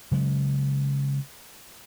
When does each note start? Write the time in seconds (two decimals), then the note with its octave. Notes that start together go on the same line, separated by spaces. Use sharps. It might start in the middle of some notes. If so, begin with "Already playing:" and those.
0.11 C#3 F#3 G#3